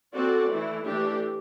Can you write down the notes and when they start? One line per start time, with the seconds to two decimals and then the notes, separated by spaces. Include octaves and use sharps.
0.13 C4 F#4 A4 D5
0.49 E3 A3 E4
0.86 E3 A3 D4 G4